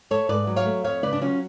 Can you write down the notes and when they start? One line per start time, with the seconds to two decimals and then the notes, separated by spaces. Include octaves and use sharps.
0.11 A3 A4 C#5
0.29 G#2 B4 D5
0.47 F#3
0.56 C#5 F5
0.66 A3
0.84 F2 C#5 F5
1.03 C#3 B4 D5
1.13 D4
1.21 F#3 C#4 F4